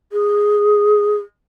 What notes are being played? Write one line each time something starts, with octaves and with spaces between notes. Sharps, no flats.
G#4